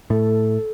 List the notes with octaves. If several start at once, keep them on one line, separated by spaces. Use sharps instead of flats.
A2 A3 A4